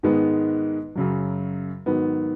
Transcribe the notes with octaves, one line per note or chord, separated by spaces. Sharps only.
G#2 D#3 G#3 B3
F#2 C#3 F#3
G#2 D#3 F#3 B3